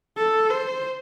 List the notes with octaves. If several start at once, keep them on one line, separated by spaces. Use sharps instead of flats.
A4
C5